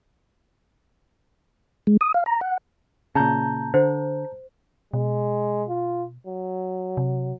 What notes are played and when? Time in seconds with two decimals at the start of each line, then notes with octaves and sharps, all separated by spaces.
1.87 G#3
2.01 D#6
2.14 F5
2.26 A#5
2.41 F#5
3.15 A#2 C#3 A5 A#5 G6
3.74 D3 C5
4.93 B2 G#3
5.69 F4
6.27 F#3
6.97 C3